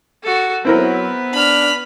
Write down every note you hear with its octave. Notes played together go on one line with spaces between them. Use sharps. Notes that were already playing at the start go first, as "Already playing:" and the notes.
F#4 A4
F#3 B3 C4 E4 A#4 B4
D4 B5 F6